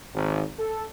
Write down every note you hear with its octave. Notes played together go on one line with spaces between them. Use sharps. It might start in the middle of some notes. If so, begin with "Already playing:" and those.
G#1
A4